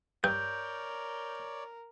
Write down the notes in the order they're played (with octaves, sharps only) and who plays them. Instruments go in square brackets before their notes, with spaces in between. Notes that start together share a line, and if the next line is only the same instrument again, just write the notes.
[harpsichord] G2 [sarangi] A#4 [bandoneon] C#5 D5 [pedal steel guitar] G6